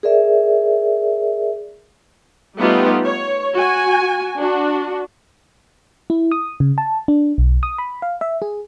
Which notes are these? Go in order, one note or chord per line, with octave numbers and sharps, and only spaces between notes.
G#4 A#4 D5 E5
G3 A3 B3 D#4 F4 G4
C#5
F#4 G#5
D4 F#4
E4
D#6
C#3
A5
D4
B1
D#6
B5
F5
E5
G#4